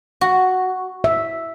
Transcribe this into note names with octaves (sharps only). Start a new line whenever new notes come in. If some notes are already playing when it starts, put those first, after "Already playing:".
F#4
E5